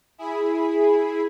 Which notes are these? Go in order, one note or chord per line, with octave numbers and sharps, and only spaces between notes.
E4 G#4 B5